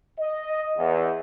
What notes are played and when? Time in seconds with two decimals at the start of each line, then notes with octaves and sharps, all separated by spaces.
0.20 D#5
0.78 E2